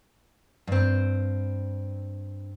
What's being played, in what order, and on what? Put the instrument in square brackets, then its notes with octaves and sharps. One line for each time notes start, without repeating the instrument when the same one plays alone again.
[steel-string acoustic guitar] G2 C4